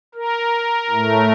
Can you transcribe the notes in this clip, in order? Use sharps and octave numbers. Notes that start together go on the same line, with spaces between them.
A#4
A2 A3